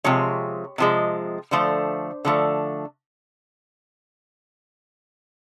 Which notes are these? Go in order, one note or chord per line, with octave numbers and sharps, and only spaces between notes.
C3 F3 G#3 C#5
C3 F3 G#3
D3 F3 A3 C5
D3 F3 A3